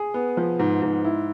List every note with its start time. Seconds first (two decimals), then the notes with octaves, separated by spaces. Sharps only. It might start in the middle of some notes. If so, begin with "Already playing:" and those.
Already playing: G#4
0.14 B3
0.37 F3
0.59 G#2
0.82 G#2
1.04 E4